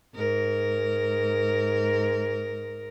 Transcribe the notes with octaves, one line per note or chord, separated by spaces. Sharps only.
G#2 A#4